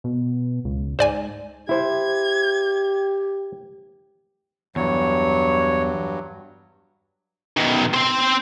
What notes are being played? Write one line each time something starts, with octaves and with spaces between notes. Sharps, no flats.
B2
C#2
G#2 C5 D5 G#5
E4 G4 C5 G#6
E2 G2 F#3 C#5
B2 D#3
C4 C5